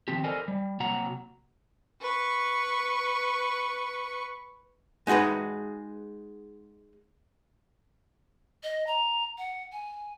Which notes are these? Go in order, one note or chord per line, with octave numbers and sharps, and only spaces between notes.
D#3 F3 C4 G4
A4 A#4 C5 D5 D#5 G#5
G3
C3 F#3 A#3 F#4 F#5 A#5
B4 C#6
G#3 D#4 F#4 G#4 B4
D#5
A#5
F#5
G#5